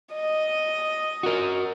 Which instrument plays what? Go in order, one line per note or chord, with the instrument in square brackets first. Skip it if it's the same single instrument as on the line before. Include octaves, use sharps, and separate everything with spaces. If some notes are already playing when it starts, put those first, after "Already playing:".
[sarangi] D#5
[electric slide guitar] F#4 A#4